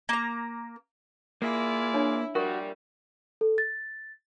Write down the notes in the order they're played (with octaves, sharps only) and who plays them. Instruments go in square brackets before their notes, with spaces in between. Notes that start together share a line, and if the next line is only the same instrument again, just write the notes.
[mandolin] A#3 A#5
[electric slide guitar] A#3 [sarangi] E4 [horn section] F4 G#4 D5
[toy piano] D4 C#5
[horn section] A#2 G3 [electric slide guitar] F#4 [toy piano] A#4 C#6
[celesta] A4
A6